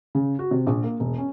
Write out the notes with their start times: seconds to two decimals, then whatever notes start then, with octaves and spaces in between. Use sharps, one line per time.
0.15 C#3
0.39 F#4
0.51 C3
0.67 A#1
0.84 A#3
1.00 E1
1.18 C#4